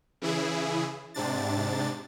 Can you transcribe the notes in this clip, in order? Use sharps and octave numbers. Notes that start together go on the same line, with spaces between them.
C#3 E3 E4 G#4
G#2 C3 D4 A6